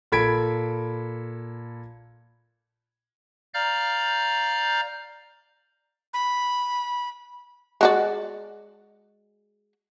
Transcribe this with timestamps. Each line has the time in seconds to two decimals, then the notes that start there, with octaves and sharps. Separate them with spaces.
0.12 A#2 A4 B5 G#6 B6 D7
3.54 D5 F5 A#5 F6 G6
6.14 B5
7.81 G#3 F#4 D5